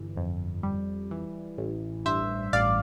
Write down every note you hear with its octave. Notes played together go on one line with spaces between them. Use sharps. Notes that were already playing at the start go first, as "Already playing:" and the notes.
Already playing: G1 E3
F2
G3
E3
A1
G2 C5 E5
A1 D5 F5